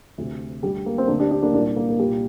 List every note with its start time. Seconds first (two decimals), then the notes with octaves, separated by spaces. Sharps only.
0.18 D2 C3
0.63 D3 G3
0.67 D2
0.86 A#3
0.98 C4
1.08 D2 D3 A#3 D4
1.19 D4 G4
1.31 D4 G4
1.42 A#3 D4
1.54 C2 A#2 A#3 D4
1.77 A#3
1.89 A#3
1.99 C2 A#2 G3